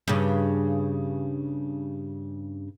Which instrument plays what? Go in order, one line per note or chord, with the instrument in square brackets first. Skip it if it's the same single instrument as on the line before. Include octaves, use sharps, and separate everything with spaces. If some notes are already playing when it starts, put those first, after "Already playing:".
[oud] G2 C#3